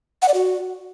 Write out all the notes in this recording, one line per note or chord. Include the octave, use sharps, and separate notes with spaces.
F#5
D5
F#4